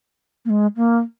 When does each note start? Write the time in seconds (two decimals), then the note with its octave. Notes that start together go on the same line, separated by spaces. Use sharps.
0.45 A#3
0.50 G#3
0.76 A#3